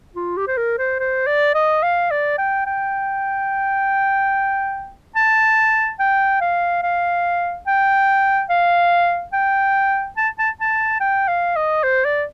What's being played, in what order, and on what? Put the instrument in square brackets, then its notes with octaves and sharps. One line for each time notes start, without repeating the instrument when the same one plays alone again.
[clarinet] F4
G4
C5
A#4
C5
C5
D5
D#5
F5
D5
G5
G5
A5
G5
F5
F5
G5
F5
G5
A5
A5
A5
G5
F5
D#5
C5
D5